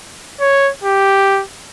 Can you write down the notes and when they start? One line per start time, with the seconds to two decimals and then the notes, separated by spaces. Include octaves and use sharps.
0.41 C#5
0.84 G4